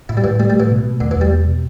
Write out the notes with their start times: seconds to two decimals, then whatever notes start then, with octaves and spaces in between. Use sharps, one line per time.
0.09 A2 E4
0.17 G3
0.24 A2 E3
0.40 G3 A3
0.50 A2 G3
0.60 E3
0.71 B2
0.85 A3
1.00 E2 D3
1.11 E3
1.16 E2 G3
1.32 B3
1.47 B2